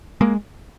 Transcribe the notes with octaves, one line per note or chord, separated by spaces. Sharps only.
G#3 A#3